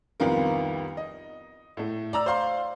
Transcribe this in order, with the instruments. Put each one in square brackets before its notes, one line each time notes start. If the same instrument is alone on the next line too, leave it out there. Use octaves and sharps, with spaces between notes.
[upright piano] C2 F2 D#3 B3 F4 A#4
D#5
A2 A3
D5 A#5 E6
C5 D5 F5 C6